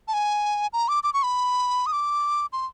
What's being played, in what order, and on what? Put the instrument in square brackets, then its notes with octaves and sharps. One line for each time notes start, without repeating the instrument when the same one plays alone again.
[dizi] A5
G#5
A#5
D6
D6
C#6
B5
D#6
D6
C6